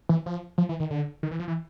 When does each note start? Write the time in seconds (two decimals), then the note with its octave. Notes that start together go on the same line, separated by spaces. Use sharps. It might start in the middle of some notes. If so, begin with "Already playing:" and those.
0.09 E3
0.26 F3
0.58 F3
0.69 E3
0.80 D#3
0.91 D3
1.23 D#3
1.31 E3
1.39 F3
1.48 E3